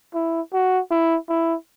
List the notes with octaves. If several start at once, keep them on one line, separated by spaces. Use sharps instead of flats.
E4
F#4
E4
E4